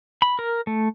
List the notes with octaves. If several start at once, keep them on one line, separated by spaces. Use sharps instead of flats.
B5
A#4
A3